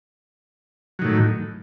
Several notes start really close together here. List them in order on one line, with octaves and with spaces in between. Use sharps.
F#3 D#3 A2